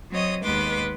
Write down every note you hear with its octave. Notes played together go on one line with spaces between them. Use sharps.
F#3 C4 C#5 D#5 D#6
D#2 G#3 B3 B4 C6 D6